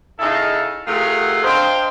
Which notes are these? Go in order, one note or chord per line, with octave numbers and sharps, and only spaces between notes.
C#3 D#4 E4 G#4 A4 F5
C3 A3 F4 G#4 A#4 F#5
D4 C5 D#5 F5 G5